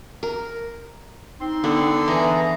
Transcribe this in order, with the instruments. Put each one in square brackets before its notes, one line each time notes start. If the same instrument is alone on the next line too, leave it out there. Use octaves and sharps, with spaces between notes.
[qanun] A#4
[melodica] C4 C6 [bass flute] D#4
[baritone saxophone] D3 [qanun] B3
[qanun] E3 E4 [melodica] G#4 A#5 [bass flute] B4